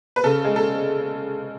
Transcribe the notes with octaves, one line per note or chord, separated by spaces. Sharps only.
B4
C#3 A4
G#3
A4